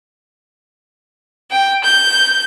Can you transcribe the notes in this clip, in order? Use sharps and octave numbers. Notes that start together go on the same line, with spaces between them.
G5
G6